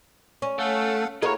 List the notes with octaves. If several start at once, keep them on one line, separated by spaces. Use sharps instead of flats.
C#4
A3 A4 F5 F#5
A#3 E4 F#4 G#4 A#4 C#5 D#5